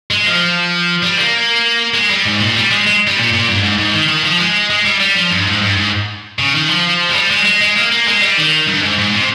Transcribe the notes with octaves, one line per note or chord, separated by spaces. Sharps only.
G#3
F3
G3
A#3
G#3
G3
G#2
A#2
G3
G#3
G#3
G3
A#2
A#2
G2
G#2
G#2
D#3
D#3
F3
G#3
G#3
G3
G3
F3
G2
G#2
G2
G#2
C#3
D#3
F3
G#3
G3
G#3
G#3
G#3
A#3
A#3
G#3
G3
D#3
G2
G#2
G#2
C3